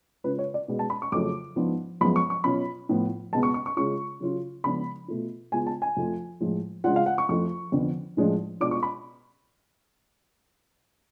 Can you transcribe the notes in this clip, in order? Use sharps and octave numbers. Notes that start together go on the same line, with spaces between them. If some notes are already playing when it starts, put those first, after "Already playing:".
C#3 G#3 C#4 F4 B4
C#5
D5
B2 G#3 B3
A5
B5
C#6
F2 C#3 F#3 A3 F4 D6
G#2 F3 B3 D4
F#2 F3 G#3 B3 B5
C#6
C#6
B2 F#3 C#4 F4 B5
A2 F3 B3 F4
C#2 B2 G#3 B3 A5
C#6
C#6
C#6
C#3 G#3 C#4 F4 C#6
C#3 F#3 C#4 F4
C#3 F3 G#3 B3 D4 B5
B2 A3 F4
C#3 G#3 B3 F4 G#5
A5
G#5
F2 F3 A3 F4
A2 F3 G#3
C#3 G#3 D4 F4 F#5
F5
F#5
C#6
F2 F3 A3 F4 C#6
F2 D3 F3 B3
A2 F3 G#3 D4
B2 G#3 D4 F4 D6
C#6
B5